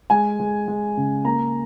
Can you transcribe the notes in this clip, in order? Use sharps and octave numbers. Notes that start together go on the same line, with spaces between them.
G#3 G#5
G#3
G#3
C#3
A#3 A#5